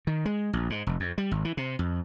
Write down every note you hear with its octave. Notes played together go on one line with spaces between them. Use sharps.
D#3
G#3
A#1
G#2
F1
F2
G3
G#1
E3
C3
F2